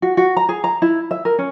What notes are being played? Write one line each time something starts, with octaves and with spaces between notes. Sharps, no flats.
F#4
F#4
A#5
G#4
A#5
E4
E5
A#4
C#4